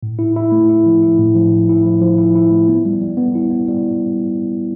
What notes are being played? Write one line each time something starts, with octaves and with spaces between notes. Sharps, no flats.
A2
E4
E4
A3
E4
F3
E4
A2
F3
A2
E4
F3
F3
E4
E4
A3
B3
G3
G3
B3
E4
B3
G3